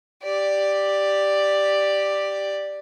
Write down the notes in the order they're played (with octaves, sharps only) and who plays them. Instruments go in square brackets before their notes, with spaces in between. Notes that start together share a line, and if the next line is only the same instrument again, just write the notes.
[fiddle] G4 D5